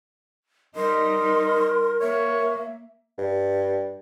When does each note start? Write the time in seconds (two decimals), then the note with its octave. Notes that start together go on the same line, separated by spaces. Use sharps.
0.76 G3 D#4 A#4 D#5 C6
2.00 A#3 C#5 E5
3.18 G2